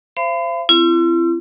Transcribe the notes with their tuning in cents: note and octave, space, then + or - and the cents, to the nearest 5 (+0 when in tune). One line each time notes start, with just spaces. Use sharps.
C5 +5 F5 -45 B5 +40
C4 +0 E4 +40